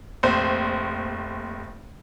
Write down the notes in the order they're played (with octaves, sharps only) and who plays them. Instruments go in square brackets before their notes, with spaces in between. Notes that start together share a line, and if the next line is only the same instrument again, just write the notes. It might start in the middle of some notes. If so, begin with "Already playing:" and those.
[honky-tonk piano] F1 A#1 C5